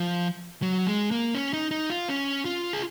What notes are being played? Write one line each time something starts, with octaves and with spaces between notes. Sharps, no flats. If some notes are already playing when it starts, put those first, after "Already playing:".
Already playing: F3
F#3
G#3
A#3
C#4
D#4
D#4
F4
C#4
F4
G#4